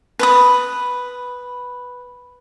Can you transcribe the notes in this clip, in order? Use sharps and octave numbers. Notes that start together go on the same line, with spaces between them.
B4 B5 D#6